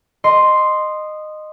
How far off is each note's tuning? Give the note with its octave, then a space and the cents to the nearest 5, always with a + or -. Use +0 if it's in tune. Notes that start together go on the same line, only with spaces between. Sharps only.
D#5 -15 C6 +0